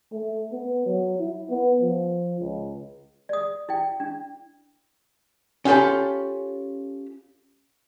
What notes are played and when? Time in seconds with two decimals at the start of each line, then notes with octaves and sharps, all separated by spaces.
0.12 A3
0.52 B3
0.86 F#3
1.19 E4
1.50 B3
1.82 F3
2.40 C#2
3.29 D5 D#6
3.69 E4 G5
4.00 D4
5.65 C#4 F4 G4 A4 B5